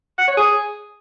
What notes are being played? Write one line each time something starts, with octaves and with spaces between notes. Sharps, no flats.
F#5
C#5
G#4